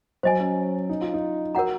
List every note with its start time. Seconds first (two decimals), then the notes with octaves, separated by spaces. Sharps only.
0.23 F#3 C5 D#5 G#5
0.40 C#4
0.89 D#4
1.01 F4
1.14 D#4
1.55 F#4 A#4 C#5 F#5 A#5